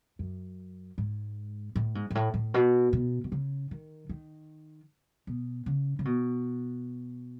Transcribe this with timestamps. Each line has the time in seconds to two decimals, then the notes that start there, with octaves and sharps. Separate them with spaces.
0.19 F#2
0.98 G#2
1.76 A2
1.95 G#2
2.11 G#2
2.15 A2
2.34 A2
2.54 B2
2.93 B2
3.24 B2
3.32 C#3
3.71 D#3
4.09 D#3
5.27 B2
5.66 C#3
5.99 C#3
6.05 B2